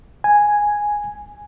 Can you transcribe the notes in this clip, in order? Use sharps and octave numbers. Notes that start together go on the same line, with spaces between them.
G#5